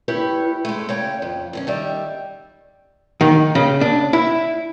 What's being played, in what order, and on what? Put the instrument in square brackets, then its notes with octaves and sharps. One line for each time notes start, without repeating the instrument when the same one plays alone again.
[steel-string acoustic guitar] E4 G4 B4 C#5
G#3 A3
C#3 C#5 G5
F2
F#2 B3 C#4
D#3 G3 E5
[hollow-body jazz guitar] D#3
C#3
D4
E4